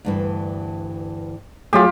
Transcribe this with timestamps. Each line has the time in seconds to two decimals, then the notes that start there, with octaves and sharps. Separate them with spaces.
0.05 D2 G2 E3
1.73 F#3 A3 F4 G4 G#4